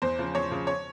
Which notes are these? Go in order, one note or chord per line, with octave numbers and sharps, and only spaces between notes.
E2 C5
C#3 F3
E2 C#5
C#3 F3
C#5